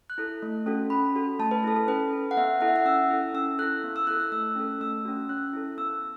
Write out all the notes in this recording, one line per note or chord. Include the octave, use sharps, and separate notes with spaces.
F#6
E4 A4
A3
C#4 F#4 A4
C#4 B5
F#4 A4
A3 A5
B4
E4 A4
A4
C#4 B4
A4
F#5
B3 E5
E4 A4 F#5
E5
F#5
C#4 E6
E4 A4
C#4 E6
E4 A4 F#6
B3
E6
E4 A4 F#6
F#6
A3 E6
C#4 A4
A3 E6
C#4 F#4
C#4 F#6
E4 A4
B3 E6